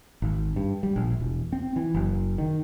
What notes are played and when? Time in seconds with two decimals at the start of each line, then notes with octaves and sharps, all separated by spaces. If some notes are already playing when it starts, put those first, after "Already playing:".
0.22 G#1
0.56 G2
0.83 G3
0.96 A#1
1.20 E1
1.52 C4
1.76 E3
1.94 F#1
2.38 D#3